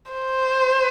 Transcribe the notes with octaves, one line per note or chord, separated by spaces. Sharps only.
C5